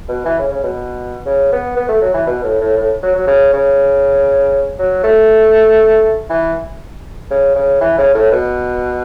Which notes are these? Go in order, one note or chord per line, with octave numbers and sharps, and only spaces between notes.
B2
E3
C#3
C#3
B2
C#3
B3
B3
A3
F#3
E3
B2
A2
A2
A2
F#3
F#3
C#3
C#3
F#3
A3
E3
C#3
C#3
E3
C#3
A2
B2